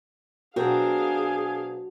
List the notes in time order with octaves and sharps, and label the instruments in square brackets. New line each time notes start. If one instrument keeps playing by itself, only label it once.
[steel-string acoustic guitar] B2 C4 A#4 [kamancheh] D4 F5 [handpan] F#4 [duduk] G#4